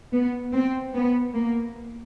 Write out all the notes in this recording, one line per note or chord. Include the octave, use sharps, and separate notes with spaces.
B3
C4
B3
A#3